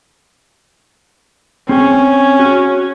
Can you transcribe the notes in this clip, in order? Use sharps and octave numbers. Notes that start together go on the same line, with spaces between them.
C4 C#4 G#4 G5
F#4